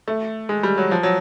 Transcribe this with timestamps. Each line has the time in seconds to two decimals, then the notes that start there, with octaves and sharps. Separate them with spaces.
0.08 A3
0.49 G#3
0.63 G3
0.78 F#3
0.91 F3
1.03 F#3